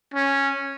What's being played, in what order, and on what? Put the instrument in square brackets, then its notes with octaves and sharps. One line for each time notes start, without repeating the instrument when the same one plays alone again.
[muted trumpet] C#4